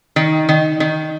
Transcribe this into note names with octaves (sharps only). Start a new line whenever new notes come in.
D#3
D#3
D#3